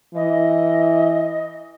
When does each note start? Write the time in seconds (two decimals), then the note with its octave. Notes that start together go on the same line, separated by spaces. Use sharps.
0.15 E3 D#5